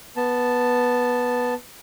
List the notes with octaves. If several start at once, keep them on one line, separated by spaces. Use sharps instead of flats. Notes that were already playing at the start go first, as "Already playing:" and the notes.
B3 A5